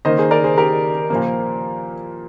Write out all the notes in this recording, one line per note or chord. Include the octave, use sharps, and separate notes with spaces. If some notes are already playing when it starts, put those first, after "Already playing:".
D#3 A#3 C5 D#5
G#4 C5
A#4 D5
G#4 C5
G4 A#4
A#2 F3 A#3